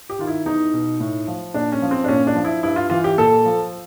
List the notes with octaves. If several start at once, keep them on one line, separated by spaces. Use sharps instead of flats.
G4
D#3 F4
E4
E2 D#4
B2
A2
F3
A#2 D4
C#4
F3
C4
D4
A#2 C#4
D4
F3
E4
G2 E4
F4
E3 F4
G4
A#2 A4
F3